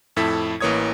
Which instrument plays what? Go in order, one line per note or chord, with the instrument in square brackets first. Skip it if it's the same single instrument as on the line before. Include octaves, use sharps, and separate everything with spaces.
[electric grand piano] F2 A2 E4 A4 B6
A1 E3 A#3 C#5 D#6 G#6